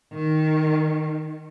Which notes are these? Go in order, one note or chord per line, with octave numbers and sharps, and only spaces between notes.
D#3